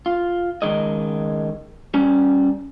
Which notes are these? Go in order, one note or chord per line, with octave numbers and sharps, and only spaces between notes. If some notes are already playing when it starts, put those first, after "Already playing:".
F4
C#2 B2 D#3 G#3 D#5
G3 C#4 G#5